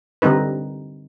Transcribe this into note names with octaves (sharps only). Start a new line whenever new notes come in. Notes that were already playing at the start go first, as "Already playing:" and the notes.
D3 G3 C4 D#4 B4